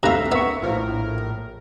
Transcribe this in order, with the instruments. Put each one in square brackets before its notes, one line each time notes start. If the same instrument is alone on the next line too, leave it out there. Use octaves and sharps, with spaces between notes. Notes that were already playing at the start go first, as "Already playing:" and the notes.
[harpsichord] C3 A3 [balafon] D4 D#4 A4 [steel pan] E5 F5 A#5
[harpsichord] B3 [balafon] D4 A#4 [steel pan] E5 C#6
[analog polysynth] A#1 A2 A#4 [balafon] F4 C5 F5